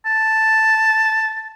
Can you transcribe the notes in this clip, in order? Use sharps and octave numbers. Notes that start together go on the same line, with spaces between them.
A5